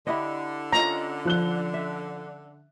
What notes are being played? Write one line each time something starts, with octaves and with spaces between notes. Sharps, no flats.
D3 E4 G4 D#5
C#4 F4 D#5 A#5
F3 F#6 G7
E5